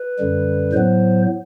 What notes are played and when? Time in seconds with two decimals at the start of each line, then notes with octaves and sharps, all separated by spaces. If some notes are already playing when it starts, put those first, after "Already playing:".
Already playing: B4
0.19 F#2 D3 G3
0.73 A2 F#3 B3 C5